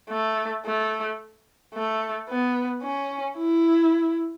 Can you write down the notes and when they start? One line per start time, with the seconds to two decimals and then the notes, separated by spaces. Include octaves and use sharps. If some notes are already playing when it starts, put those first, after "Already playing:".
0.09 A3
0.65 A3
1.74 A3
2.29 B3
2.83 C#4
3.38 E4